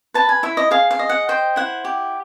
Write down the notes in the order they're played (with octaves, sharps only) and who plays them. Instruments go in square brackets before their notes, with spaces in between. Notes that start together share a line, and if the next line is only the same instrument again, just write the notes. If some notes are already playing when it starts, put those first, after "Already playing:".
[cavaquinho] B4 A5
G#5
E4 E5
D#5
G#4 F5
F5
D#5
F#5
C5 G5
E4 F#5
G4